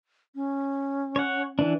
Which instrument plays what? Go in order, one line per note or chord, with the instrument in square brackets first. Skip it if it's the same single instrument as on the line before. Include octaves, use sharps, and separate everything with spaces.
[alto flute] C#4
[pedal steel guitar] C#5 F#5
E3 D4